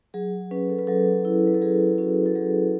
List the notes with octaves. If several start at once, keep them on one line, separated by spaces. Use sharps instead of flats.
F#3 G#4
C#4 B4
A4
B4
F#3 A4
E4
B4
A4
F#3 G#4
C#4 F#4
A4
F#3 G#4